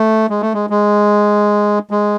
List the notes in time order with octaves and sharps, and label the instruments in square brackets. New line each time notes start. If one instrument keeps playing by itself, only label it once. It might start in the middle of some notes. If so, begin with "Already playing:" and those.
Already playing: [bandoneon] A3
G#3
A3
G#3
G#3
G#3